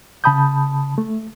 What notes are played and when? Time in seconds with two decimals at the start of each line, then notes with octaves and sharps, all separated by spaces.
0.24 C#3 A5 B5 D#6 G6
0.98 A3